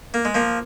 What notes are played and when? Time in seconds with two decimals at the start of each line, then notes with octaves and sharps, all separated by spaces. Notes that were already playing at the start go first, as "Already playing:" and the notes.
0.14 A#3
0.25 G#3
0.35 F3 A#3